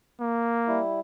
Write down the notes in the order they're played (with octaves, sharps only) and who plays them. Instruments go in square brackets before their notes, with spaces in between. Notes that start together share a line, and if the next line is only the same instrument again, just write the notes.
[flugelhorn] A#3
[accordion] G3 E4